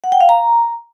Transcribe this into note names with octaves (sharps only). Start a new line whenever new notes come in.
F#5
G5
F5
A#5